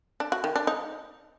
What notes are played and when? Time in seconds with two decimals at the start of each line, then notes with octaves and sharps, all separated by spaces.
0.20 D4
0.32 F#4
0.44 D#3
0.56 D4
0.67 D#4